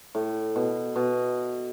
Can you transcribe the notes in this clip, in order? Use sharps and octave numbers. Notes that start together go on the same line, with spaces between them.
A2
B2
B2